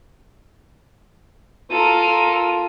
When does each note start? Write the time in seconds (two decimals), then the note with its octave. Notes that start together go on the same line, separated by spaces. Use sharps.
1.70 F4 A4 A#4 D#7